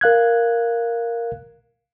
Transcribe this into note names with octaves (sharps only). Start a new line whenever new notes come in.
A#4 F5 F#6 G#6